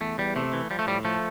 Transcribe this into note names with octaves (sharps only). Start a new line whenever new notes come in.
E2 A3
E2 G3
C3 A3
E3
F3 G3
A3
A2 G3
F3 A3